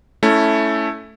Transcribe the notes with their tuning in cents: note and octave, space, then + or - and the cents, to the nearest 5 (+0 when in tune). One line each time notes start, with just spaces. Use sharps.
A3 +0 C#4 +15 E4 +0